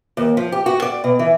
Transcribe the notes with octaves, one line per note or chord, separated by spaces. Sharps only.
D#2
F3
G4
F#4
D5
B2
E3